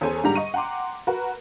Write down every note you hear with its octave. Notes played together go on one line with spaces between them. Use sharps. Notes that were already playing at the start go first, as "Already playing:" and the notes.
E2 C#4 A4 C5 G#5
G#2 D3 G3 G4 A#5
D#5 C#6 D#7
F#5 G5 A#5 C6 D6
F#4 A#4 B4